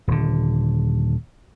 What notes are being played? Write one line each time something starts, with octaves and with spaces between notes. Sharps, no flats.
D#1 D3